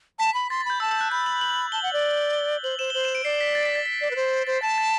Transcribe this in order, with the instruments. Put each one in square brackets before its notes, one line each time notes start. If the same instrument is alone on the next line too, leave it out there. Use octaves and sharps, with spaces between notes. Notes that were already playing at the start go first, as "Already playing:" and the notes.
[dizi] A5 [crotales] B6
[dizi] B5
[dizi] C6 [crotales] A6
[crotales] A6
[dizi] B5 [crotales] G6
[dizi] A5 [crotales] E6
[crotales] E6
F#6
[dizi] B5 [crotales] G6
[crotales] F#7
F#7
[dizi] A5 [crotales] G7
[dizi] F#5
D5
[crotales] G7
[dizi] C5 [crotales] F#7
[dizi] C5 [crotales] E7
[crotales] G7
[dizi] C5 [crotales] F#7
[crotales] E7
D7
[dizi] D5 [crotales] C7
[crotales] B6
A6
B6
A6
B6
[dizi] D5
B4
C5
[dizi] C5 [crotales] A6
[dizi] A5 [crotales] A6
[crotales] A6